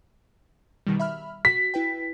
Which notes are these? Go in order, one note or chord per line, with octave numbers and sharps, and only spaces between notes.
B2 D#3 G3
E5 B5 F6
F#4 B6
E4 B4 G5